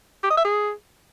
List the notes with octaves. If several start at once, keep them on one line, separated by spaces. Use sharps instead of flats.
G4
D#5
E5
G#4